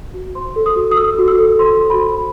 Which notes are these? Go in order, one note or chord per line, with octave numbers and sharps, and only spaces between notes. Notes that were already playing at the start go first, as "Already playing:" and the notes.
F#4
C5 C6
A4
D#6
F#4
D#6
A4 E6
F#4
E6
A4
C5 C6
F#4
B5
C5